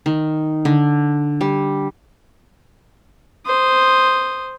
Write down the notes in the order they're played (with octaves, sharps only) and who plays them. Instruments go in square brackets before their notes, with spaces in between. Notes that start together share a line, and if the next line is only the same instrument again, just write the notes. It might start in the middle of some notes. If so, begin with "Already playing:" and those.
[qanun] D#3
D3
G3
[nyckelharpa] C5 D#6